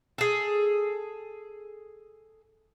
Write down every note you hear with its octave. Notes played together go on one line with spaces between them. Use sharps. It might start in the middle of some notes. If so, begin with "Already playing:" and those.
G#4 A4